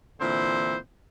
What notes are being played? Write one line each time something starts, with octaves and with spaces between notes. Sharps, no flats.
A#2 D3 E3 C4 E4 C5